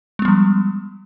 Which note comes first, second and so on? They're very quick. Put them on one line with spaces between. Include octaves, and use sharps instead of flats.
G#3 B3 G3 F3